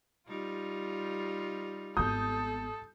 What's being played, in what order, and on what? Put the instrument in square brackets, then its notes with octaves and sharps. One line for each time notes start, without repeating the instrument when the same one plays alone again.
[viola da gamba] G3 D#4 F4
[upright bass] G#1 B3 [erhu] A4 [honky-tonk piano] D#6 G6